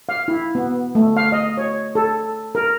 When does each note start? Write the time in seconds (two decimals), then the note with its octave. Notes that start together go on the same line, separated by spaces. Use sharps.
0.09 F5
0.28 E4
0.55 B3
0.95 A3
1.17 F5
1.32 D#5
1.58 C#5
1.95 A4
2.55 A#4